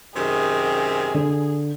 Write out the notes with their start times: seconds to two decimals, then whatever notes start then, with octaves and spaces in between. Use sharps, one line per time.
0.15 F#2 C3 D#3 G#4
1.14 D3